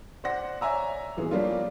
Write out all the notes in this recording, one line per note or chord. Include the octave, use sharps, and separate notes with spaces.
C5 D5 F#5 A#6
C#5 D5 E5 G#5 A#5 E6
A#2 E3 B3 G#4
F3 G3 A#3 D4 F4 C#5